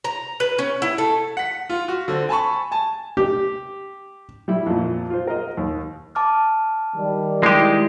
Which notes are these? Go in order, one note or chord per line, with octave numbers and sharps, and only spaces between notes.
A#5
B4
C#4
E4
A3
F#5 B6
F4
F#4
D3 C4
G#5 A5 B5 C#6
G#5 A5
G4
G3 E4
F2 A#2
F4 C5
A#4 D#5
D#2
A5 D6 F6
D#3 G3
G#3 E4 G4 G5